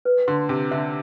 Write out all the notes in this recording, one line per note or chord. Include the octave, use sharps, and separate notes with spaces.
B4
D3 C6
C3 A5
D3 E5